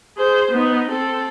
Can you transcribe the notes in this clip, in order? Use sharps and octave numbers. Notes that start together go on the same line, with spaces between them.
G#4 C5
B3 D#4
C4 A4